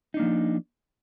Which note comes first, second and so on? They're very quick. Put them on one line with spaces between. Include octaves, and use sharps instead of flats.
D#4 D4 A#3 F3